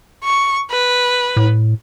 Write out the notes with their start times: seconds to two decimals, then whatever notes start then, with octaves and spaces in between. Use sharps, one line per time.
0.24 C#6
0.71 B4
1.37 A2